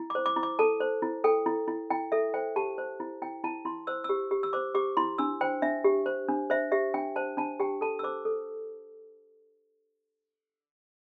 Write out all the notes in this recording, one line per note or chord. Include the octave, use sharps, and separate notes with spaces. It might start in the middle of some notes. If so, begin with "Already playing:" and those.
Already playing: E4
C5 D6
D6
E4
D6
A4 A5
C5
E4
A4 G5
E4
E4
E4 G5
A4 E5
C5 G5
G4 A5
C5
E4
E4 G5
E4 A5
E4 C6
C5 E6
E6
G4
G4
E6
C5 D6
G4 D6
E4 C6
D4 E6
C5 G5
D4 E5
G4
C5
D4
C5 E5
G4 E5
D4 G5
C5 A5
D4 A5
G4 G5
A4 A5
E6
C5 D6
A4